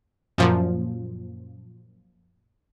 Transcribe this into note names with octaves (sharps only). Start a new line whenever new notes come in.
F#2 A#2 F3